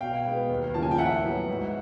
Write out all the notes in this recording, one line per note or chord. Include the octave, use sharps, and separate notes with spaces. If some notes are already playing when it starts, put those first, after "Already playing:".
B2 F5 G5
G#3 B3
D#2
C#3 F3 A#3 A5
G#5
G5
A2 E5 F#5
F#3 B3
G#2